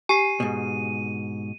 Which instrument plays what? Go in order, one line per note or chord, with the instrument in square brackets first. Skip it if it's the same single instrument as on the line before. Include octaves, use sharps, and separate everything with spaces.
[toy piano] G4 [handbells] G#5 C7 [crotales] D#7
[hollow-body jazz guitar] G#2 B2